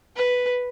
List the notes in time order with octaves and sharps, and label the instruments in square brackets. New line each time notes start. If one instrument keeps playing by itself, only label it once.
[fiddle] B4